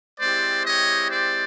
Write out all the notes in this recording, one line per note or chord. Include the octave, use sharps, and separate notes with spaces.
G#3 C4 E4 G4 C5 D5
C#5 D#5
C5 D5